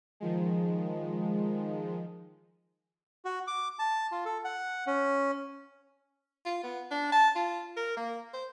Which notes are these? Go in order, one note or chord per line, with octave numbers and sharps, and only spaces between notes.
D#3 F3 G#3
F#4
D6
A5
F4
A4
F#5
C#4
F4
B3
D4
A5
F4
A#4
A#3
C5